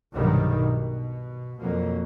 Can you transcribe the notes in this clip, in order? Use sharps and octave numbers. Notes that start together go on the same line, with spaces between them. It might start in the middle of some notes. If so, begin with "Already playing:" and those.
B1 G2 C3 D#3 F#3 G3
B2
F2 B2 F#3 A#3